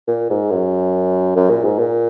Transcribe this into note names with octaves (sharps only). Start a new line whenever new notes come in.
A#2
G#2
F#2
F#2
A#2
G#2
A#2